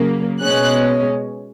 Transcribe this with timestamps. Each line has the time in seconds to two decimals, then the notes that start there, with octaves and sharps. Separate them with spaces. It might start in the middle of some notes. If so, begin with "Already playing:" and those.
Already playing: C#3 F#3 A#3
0.41 B2 G#3 C#4 F#6